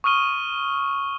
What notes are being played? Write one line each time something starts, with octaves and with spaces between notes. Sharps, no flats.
C#6 D#6 F6 D#7 G7